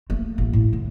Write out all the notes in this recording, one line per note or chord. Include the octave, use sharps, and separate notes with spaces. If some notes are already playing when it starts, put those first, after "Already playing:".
A3 A#3
A1
A2
D3